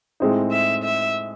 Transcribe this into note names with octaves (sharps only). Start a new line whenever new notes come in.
A2 G#3 C4 D#4
E5
E5